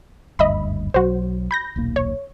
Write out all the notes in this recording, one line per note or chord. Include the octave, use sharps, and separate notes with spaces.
F#1 D2 G2 D#5 E5 B5
B1 F#3 F#4 C5
B5 G6 A#6
D#1 B1 A#3
C#5